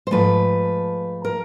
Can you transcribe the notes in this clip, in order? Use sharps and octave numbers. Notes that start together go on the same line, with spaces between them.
C5
G#2 F3 A3 B4
A#4